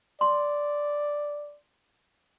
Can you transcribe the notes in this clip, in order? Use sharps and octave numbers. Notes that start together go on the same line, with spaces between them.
D5 C6